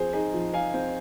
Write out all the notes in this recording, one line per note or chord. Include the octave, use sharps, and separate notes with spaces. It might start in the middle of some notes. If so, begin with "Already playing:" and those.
Already playing: F3 C4 G#4 C5
D#4 G#4 C5
F3
F3 F5 G#5
C4